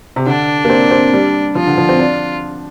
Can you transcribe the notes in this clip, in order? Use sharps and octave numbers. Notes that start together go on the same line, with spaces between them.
C3
D3 D4
A#3
C4
C4
G3
F3 F4
D3
F3
C4
D4